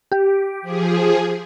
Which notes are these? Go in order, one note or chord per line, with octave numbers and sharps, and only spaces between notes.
G4
F3 G#4